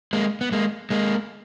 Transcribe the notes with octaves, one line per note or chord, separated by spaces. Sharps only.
G#3 A#3
B3
G#3 A#3
G#3 A#3